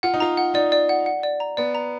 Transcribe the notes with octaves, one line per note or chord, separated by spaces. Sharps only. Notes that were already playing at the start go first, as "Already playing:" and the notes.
F4 F#5
D#4
F4 A#5
F#5
D#4 D5
D5
F#5
F#5
D5
A#5
B3 D5
A#5